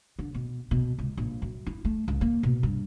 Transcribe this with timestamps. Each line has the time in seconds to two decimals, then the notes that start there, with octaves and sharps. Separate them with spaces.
0.19 D3
0.34 B2
0.71 B2
0.98 C#2
1.17 A#1
1.42 F#2
1.66 E4
1.85 A3
2.08 C#2
2.21 A#3
2.43 B2
2.63 G2